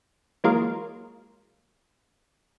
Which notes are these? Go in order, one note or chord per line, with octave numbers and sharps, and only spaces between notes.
E3 F#3 G#3 A#3 F4 A#4